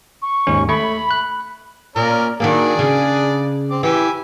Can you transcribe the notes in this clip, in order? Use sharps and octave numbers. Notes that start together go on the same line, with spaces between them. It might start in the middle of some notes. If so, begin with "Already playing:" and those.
C#6
D#2 G#2 C#4
A3 B5 C#6
F#6
A#2 C#4 A#4 D5
D#3 F#3 A#3 D4 G#4 D5
C#3
C4 D6
E3 G4 G#5 E6